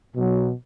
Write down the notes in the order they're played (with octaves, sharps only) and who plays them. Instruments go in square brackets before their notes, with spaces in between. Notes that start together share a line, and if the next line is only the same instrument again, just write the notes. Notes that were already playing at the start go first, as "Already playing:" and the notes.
[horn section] B2 F#3